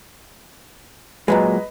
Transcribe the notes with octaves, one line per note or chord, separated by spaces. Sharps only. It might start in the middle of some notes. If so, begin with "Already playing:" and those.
A#2 F#3 G#3 B4 D#5 A#5